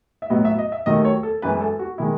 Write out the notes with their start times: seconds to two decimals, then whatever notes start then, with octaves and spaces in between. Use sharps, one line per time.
0.22 E5
0.30 A2 F#3 B3 D#5
0.45 E5
0.59 D#5
0.72 E5
0.86 D#2 D#3 F#3 A3 D#5
1.05 C#5
1.23 A4
1.42 F#2 E3 G#3 B4
1.61 A4
1.79 F#4
1.98 D#3 G#3 E4